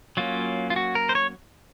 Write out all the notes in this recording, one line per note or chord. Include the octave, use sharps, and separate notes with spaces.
F#3 A#3 C#4 F4
F4
F#4
A#4
C5
C#5